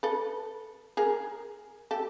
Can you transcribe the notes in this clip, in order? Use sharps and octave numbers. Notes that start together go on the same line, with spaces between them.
A4 B4
G#4 A#4
G4 A4